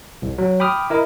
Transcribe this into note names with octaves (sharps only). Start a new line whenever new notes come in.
C2
F#3
G5 B5 D6 D#6 F6
E4 A#4 D#5